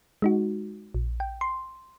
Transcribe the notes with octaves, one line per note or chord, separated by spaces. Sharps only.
G#3 D#4 F#4
A#1
G5
C6